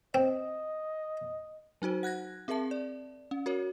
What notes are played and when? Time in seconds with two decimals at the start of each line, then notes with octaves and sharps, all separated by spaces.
0.14 C4 D#5
1.82 F#3 D#4 F#4 C5
2.03 F#5 F#6 G#6 A#6
2.48 C4 G#4 A#4 E5 A5
2.71 D5
3.31 C#4
3.46 F#4 A#4 C#5